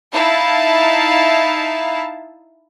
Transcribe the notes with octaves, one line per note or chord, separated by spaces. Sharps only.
D#4 E4 F5 A5